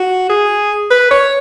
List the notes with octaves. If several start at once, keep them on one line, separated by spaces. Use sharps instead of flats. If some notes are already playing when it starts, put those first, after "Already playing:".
Already playing: F#4
G#4
B4
C#5